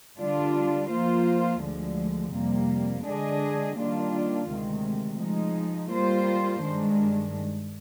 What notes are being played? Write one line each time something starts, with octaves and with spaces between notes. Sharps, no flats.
D3 G3 D4 F4
F3 A#3 F4 C5
D2 D3 F3 G#3
F2 C3 G3 A#3
D3 G#3 D4 G#4 D#5
D#3 G3 A#3 D4 F4
D2 C3 D#3 G#3
F3 G#3 D#4
G3 A#3 F4 C5
G2 D#3 G#3 D4